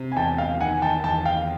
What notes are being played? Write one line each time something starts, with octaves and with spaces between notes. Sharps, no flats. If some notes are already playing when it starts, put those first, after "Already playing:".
Already playing: C3
G#5
E2 G5 A5
F5 G5
D#3 F#5 G#5
G5 A5
E2 G5 A5
F5 G5